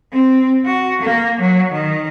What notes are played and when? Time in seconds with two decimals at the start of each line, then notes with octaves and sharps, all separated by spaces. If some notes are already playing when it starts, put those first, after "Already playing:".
0.13 C4
0.65 F#4
1.02 A#3
1.41 F#3
1.72 D#3